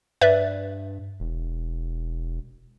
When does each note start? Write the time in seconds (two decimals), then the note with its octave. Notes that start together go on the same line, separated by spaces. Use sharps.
0.21 G2 B4 D5 E5
1.20 E1